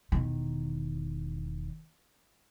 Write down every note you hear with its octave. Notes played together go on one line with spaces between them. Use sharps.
E1 D#3